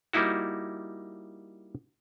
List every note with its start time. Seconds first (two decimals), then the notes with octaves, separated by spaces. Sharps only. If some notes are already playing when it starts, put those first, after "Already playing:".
0.13 G3 A#3 D#4 E4 F#4